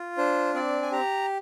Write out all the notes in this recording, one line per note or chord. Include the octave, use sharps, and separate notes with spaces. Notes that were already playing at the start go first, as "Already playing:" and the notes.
Already playing: F4
D4 C5
C4 D5
G#5
G4 A#5